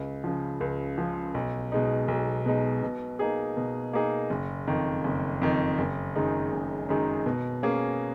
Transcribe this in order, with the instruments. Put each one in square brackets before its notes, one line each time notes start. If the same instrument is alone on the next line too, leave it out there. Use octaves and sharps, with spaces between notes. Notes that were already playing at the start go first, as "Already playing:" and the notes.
Already playing: [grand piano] C#2
C#3 F3
C#2
C#3 F3
B1
B2 G#3 D#4
B1
B2 G#3 D#4
B2
A#3 D#4 G#4
B2
A#3 D#4 G#4
F#1
F2 D#3
F#1
F2 D#3
F#1
F#2 D#3 G#3 D#4
F#1
F#2 D#3 G#3 D#4
B2
A#3 C#4 G#4